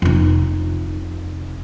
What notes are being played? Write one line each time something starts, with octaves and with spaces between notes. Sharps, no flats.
F1 D#4